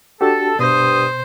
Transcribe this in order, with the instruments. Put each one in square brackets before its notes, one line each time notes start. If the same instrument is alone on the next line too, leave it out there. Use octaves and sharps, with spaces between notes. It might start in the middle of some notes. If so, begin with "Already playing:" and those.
[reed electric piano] D4 F#4 G4 [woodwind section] A4
[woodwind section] G2 D#6 [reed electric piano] B2 [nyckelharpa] C5